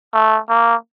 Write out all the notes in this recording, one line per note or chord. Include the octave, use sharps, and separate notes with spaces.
A3
A#3